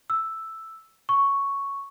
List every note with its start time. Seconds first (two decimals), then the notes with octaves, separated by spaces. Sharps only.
0.10 E6
1.09 C#6